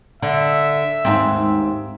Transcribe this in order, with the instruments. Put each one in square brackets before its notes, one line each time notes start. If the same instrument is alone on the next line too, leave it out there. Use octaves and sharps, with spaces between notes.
[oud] D3 [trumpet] E5
[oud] D#2 G#2 C4